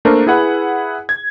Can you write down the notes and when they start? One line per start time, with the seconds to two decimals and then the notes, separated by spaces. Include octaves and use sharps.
0.05 A3 A#3 D4 A#4 C5
0.27 E4 G#4 B4 F#5
1.09 G#6